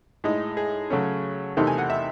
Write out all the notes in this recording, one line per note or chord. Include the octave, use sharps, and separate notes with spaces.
A2 G#3 D#4
G#4
C#3 F#3 A3 C#4
E2 C3 D#3 A3 D#4
G#5
F#5
E5